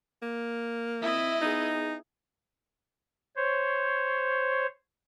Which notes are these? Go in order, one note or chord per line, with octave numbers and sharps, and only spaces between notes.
A#3
C4 E4 D#5 E5
B3 D#4 G#4
C5 C#5